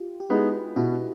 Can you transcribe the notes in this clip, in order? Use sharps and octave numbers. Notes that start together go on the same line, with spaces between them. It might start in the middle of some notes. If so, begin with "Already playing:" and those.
Already playing: F4 G4
G4
G#3 B3 D#4 E4 F#4
B2 E4 F#4